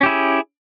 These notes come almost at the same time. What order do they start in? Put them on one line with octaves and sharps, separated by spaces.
C#4 G4 E4 G#4